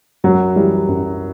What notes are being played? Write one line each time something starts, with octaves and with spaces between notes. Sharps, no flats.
F#2 F#3
E3 G3
F#2